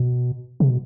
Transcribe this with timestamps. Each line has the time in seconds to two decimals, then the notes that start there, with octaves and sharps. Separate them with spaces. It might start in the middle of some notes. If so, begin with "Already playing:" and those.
Already playing: B2
0.60 C3
0.70 B2